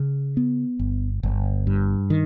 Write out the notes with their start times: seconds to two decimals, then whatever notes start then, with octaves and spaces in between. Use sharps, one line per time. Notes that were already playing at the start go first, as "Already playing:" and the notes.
Already playing: C#3
0.37 B3
0.79 G1
1.23 G1
1.67 G2
2.10 D#3